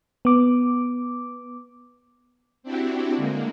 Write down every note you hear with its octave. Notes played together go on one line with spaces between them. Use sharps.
B3 D6
C4 D4 E4 F#4 G4
D3 G#3 A#3